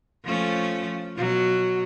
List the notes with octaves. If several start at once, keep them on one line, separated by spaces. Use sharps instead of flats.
F3 A3 C#4
B2 F#3